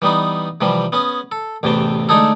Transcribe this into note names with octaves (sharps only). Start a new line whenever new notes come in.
E3 G3 B3 D#4
C3 E3 F3 G3
B3 C#4 G#4
A4
A1 E2 C3 E3 G5 A5
D3 G#3 A3 D#4 G#4 A4